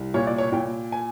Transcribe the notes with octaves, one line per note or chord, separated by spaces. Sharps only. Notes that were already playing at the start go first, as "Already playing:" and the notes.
Already playing: C2
A#2 C#5
D5
C#5
A#2 G5
G#5